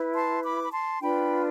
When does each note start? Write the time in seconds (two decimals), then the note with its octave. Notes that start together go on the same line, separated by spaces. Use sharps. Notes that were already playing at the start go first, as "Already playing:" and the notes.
Already playing: E4 B4
0.14 A5 C6
0.43 B5 D6
0.63 B5
0.73 A5 C6
1.02 D4 F4 B4 G5 B5